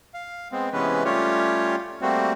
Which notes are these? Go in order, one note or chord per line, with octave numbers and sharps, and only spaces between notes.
F5
G#3 B3 C4
C3 E3 G#3 B3 C#4 B4
G3 A3 C#4 F4 G4 C#5
G3 A3 A#3 C4 F#4